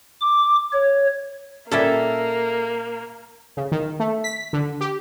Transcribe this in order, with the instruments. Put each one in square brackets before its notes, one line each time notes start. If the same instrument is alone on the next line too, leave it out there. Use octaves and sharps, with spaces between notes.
[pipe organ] D6
C#5
[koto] A#2 G3 C#4 [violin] A#3 [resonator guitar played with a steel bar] A4 E5
[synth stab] C#3
D#3
A3
B6
D3
G4